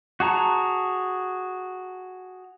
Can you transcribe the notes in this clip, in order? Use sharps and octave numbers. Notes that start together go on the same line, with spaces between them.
F#4 G#4 A5 A#5